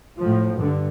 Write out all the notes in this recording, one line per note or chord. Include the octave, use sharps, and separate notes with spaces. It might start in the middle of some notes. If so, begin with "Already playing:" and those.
A2 F3
G2 D3